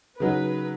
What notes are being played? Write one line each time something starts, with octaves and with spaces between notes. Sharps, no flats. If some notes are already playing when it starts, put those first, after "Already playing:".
C#3 F#3 D#4 B4